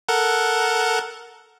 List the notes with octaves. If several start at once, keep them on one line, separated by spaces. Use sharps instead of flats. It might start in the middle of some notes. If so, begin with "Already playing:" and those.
A4 A#4 F#5